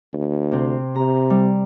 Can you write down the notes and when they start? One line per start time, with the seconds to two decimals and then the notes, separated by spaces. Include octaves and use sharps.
0.13 D2
0.52 C3 C4
0.96 C3 A#5
1.30 G3